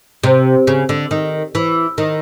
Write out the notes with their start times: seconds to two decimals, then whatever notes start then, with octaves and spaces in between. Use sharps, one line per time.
0.23 C3
0.67 C#3
0.89 D3
1.11 D#3
1.55 E3
1.98 D#3